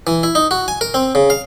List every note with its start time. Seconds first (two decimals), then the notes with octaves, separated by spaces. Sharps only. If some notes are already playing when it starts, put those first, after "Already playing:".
0.07 E3
0.23 E4
0.35 D#4
0.51 F#4
0.68 G#5
0.81 A#4
0.94 C4
1.15 C#3
1.30 F5